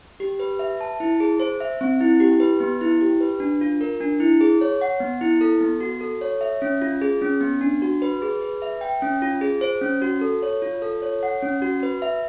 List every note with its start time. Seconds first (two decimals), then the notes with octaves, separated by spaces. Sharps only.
0.20 G4
0.40 B4
0.59 E5
0.81 A5
1.00 E4
1.20 G#4
1.40 C5
1.60 E5
1.81 C4
2.01 E4
2.20 G4
2.40 B4
2.60 B3
2.81 E4
3.01 G4
3.21 B4
3.40 D4
3.61 F4
3.81 A#4
4.01 D4
4.20 E4
4.41 G#4
4.61 C#5
4.81 F#5
5.00 B3
5.21 E4
5.41 A4
5.61 B3
5.80 F#4
6.01 A4
6.21 C#5
6.41 E5
6.62 C#4
6.82 F4
7.01 G#4
7.21 C#4
7.41 B3
7.61 D4
7.82 F#4
8.02 B4
8.22 G#4
8.41 B4
8.62 E5
8.81 G5
9.02 C#4
9.22 F4
9.41 G#4
9.61 C5
9.81 C#4
10.02 F#4
10.21 A4
10.43 C#5
10.62 F4
10.82 A4
11.02 C#5
11.23 F#5
11.43 C#4
11.62 F#4
11.83 B4
12.02 E5